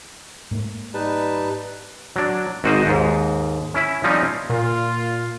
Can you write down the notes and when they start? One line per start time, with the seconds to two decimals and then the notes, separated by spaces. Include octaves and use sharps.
0.51 G#2 A3 A#3
0.94 G3 D#4 B4 A5
2.16 F#3 D4
2.64 G#1 G#2 F#4 G4 C5 D#5
2.86 D#2 G#2
3.74 C#4 E4 E5
4.04 F3 G3 C4 C#4 D#4
4.50 A#2 F4